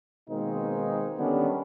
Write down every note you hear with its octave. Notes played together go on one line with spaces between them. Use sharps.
B2 D#3 G#3 A#3 C4 D#4
D3 D#3 G3 B3 C#4 D4